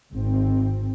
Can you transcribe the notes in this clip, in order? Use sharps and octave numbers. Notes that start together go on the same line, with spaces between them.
G#1 C4